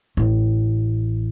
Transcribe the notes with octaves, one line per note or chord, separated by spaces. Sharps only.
A1